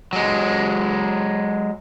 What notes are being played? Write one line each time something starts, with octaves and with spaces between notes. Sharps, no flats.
F#3 G#3